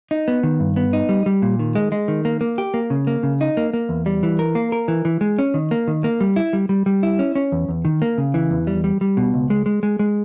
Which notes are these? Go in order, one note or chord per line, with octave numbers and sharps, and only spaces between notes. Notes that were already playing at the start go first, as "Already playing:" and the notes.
D#4
B3
D#3
G2
B3
D#4
G3
G3
A#2
D#3
G#3
G#3
D#3
A#3
A#3
G4
A#3
C#3
A#3
C#3
D#4
A#3
A#3
E2
G3
E3
A#4
A#3
A#4
E3
E3
G#3
C#4
D#3
A#3
D#3
A#3
G3
E4
G3
G3
G3
E4
C#4
C#4
E2
E2
D#3
A#3
C#3
E3
E2
G3
G3
G3
B2
C#2
G#3
G#3
G#3
G#3